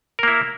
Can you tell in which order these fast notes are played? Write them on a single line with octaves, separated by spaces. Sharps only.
A#4 A#3 E4